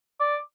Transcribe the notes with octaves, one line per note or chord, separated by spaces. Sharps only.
D5